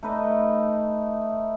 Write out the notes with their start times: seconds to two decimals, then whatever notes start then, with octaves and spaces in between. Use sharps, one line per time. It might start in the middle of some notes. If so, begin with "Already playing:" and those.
0.03 A3 D#4 B4 D#5